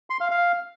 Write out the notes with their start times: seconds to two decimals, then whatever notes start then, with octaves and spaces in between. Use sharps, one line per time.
0.10 C6
0.20 F5
0.31 F5